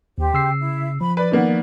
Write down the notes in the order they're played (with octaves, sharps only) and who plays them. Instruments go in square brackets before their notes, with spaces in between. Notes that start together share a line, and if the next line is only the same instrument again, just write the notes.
[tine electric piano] D#2 [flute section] G4 C5
[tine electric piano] C#3 E6 C7
[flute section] E4
[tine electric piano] F3 [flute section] B5
[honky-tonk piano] B4 [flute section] D5
[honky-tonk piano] D#3 A#3 B3